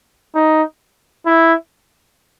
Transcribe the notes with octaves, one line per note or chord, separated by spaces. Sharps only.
D#4
E4